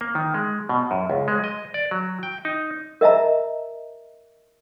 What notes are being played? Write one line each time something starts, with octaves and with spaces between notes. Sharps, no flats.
A#3
D#3
G#3
B2
F#2
C#2
G#3
D#5
D5
F#3
G5
D#4
A#4 D#5 E5 A5 A#5